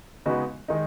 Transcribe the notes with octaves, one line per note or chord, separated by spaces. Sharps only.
C#3 G#3 B3 D#4 F#4
D#3 G#3 D#4